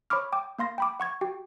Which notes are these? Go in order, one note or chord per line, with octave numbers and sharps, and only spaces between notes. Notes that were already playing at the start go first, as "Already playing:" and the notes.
C#5 B5 C#6 D6 F6
G5 D6
A#3 F5 C6 A#6
G5 B5 D6
F#5 C#6 G#6
F#4 G4 G5